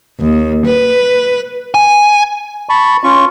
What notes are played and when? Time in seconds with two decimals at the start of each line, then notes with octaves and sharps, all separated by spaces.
0.19 D#2
0.64 B4
1.74 G#5
2.69 A5 B5 C#6
3.04 C#4 F4 C#6